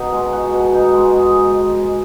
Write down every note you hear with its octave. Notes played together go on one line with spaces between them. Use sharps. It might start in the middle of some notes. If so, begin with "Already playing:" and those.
Already playing: B2 D#4 F#4
G#3
F#4
B2
D#4
G#3
G#4